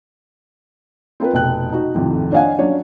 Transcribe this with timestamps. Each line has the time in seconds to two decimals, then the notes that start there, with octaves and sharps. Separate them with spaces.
1.20 C4 F4 A#4 B4
1.33 F1 B2 G5 F#6
1.72 D#4 F#4
1.95 G#1 F2 A2 C3
2.32 D4 C#5 D#5 F5 F#5 G#5
2.59 F#3 C#4 D4 C#5